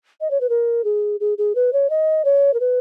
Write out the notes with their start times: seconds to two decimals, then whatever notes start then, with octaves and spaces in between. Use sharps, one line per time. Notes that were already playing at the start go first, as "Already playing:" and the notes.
0.21 D#5
0.31 C#5
0.41 B4
0.49 A#4
0.84 G#4
1.20 G#4
1.38 G#4
1.55 B4
1.73 C#5
1.90 D#5
2.25 C#5
2.54 A#4
2.60 B4